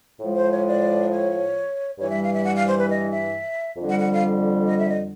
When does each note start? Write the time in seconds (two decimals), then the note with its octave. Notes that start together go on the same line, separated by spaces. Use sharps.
0.21 A2 F3 G#3
0.36 C5
0.51 C#5
0.66 D5
1.11 C#5
1.99 G2 E3 G3 C#5
2.10 E5
2.21 F5
2.32 E5
2.45 F#5
2.56 F5
2.67 C5
2.78 B4
2.89 D#5
3.10 E5
3.77 F2 D3 G3
3.89 F#5
3.99 F#5
4.12 F5
4.67 D#5
4.79 E5
4.90 D#5